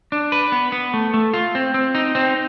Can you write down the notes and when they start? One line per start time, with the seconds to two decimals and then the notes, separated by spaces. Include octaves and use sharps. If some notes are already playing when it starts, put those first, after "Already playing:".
0.12 D4
0.32 B4
0.52 B3
0.72 B3
0.94 A3
1.14 A3
1.34 F4
1.55 C4
1.74 C4
1.95 D#4
2.15 C4